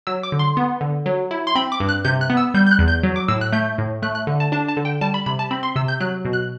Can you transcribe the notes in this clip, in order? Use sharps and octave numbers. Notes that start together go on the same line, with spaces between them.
F#3 E6
D6
D3
C6
B3
D3
F#3
E4
C6
C4 B5
D6
G2
F#6
C3 G6
F#6
B3
E6
G3 G6
G6
F#6
E2
G6
F#3
D6
A2 E6
F#6
A3 G6
A2
A3 F#6
F#6
D3
A5
D4 A5
A5
D3
G5
G3 A5
B5
C3 B5
A5
C4 B5
C6
C3 E6
G6
F#3 F#6
B2
F#6